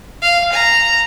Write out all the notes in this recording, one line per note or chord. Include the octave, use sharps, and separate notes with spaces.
F5
A#5